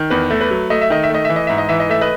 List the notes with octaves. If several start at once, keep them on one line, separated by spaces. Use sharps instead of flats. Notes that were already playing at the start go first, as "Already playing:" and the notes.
Already playing: D#3
E2 B4
A3
B4
F#3
A3 D#5
E5
D#3 D#5
E5
A3 D#5
E3 E5
D#5
G#2 E5
D#5
E3 E5
D#5
A3 E5
B4 D#5